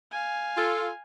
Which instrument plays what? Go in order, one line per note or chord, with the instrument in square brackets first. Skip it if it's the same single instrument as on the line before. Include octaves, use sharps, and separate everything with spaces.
[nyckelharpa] F5 G#5
[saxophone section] F4 A4